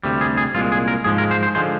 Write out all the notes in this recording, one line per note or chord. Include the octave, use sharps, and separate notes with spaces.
D2 C3 G3
G#4
G#4
C2 A#2 G#3 F4
G#4
A#4
G#2 F3 G#3 G#4
A#4
C5
C5
D3 F3 G#3 C5